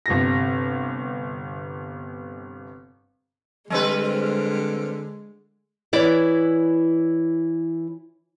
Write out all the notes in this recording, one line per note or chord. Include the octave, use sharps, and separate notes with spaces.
G1 C3 A#6
D3 G3 G#3 C4 B4
E3 E4 C#5 D5